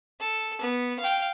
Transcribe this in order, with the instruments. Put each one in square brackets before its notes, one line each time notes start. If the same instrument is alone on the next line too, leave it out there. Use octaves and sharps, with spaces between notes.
[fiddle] A4
B3
F5 G5